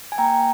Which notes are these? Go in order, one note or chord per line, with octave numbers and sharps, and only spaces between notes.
G#5
A#3 G5 A#5